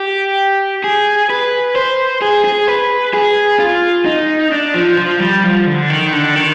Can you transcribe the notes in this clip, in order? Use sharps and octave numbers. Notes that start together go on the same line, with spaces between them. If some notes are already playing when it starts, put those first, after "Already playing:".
Already playing: G4
G#4
B4
C5
G#4
G#4
B4
G#4
F4
D#4
D4
F3
F3
G3
F3
D3
D#3
D3
D#3